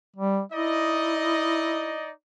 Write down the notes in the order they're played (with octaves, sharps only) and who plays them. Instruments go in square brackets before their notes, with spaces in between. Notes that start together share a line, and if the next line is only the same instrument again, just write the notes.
[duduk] G3
[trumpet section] D#4 D5 D#5 [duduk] E4